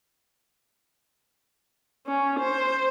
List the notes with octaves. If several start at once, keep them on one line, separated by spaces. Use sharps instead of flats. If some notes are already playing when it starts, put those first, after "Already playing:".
C#4
C5